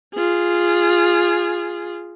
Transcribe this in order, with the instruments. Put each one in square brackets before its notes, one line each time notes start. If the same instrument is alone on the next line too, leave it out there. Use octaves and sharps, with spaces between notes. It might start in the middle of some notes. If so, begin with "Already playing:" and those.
[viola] F4 G#4